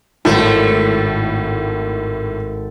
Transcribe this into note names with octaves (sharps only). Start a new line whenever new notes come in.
G#1 A2 A3